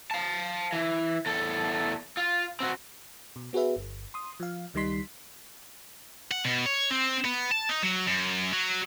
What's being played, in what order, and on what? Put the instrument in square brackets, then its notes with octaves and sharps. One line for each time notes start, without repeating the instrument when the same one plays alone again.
[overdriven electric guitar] F5 A5
E3
E2 A4
F4
C4 F#4
[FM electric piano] B2
B3 F#4 G#4 B4 E5
G1
C6 D#6
F3 F5
C#2 D#3 G3 D#4 C6 B6
[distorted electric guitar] F#5
B2
C#5
C4
B3
A5
D#4
F#3
F#2
F#3